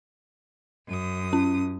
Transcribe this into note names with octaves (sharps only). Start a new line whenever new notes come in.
F#2 D#6
C#4